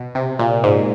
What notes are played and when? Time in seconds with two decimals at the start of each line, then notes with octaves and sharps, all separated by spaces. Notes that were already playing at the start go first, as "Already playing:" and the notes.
Already playing: B2
0.15 C3
0.39 A#2
0.64 G#2